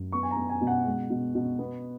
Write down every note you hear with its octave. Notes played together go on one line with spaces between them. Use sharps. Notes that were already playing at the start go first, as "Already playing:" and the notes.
Already playing: F#2
B3 C#6
G#5
A#5
B3
G#5
B2
F#5
G#3
B2
B2
B3